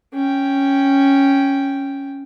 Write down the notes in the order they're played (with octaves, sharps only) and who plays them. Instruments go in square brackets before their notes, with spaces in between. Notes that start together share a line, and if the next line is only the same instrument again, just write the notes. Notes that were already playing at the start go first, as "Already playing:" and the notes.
[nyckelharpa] C#4 G5